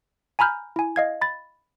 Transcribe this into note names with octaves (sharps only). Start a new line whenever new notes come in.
G#5 A#5 B5 F6 G6
E4 G#5
D#5 F5 G#6
B5 A6